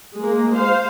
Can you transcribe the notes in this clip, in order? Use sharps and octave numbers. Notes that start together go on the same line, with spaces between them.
G#3 A#3
C5 F5